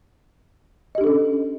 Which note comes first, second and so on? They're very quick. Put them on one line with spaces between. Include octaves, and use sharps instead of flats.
D#5 G4 D4 A4 C#4